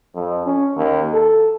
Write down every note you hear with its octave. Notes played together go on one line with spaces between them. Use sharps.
F2
C#4
D#2
A4